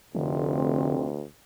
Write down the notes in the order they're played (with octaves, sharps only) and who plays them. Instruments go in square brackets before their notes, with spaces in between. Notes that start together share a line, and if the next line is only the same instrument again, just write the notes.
[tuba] F1 [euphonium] D2 [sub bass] D3 [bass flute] C4